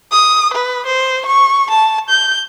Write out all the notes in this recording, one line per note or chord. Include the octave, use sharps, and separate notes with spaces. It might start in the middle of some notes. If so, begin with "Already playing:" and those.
D#6
B4
C5
C#6
A5
G6